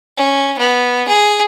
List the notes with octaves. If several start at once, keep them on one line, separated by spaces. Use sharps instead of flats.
C#4
B3
G#4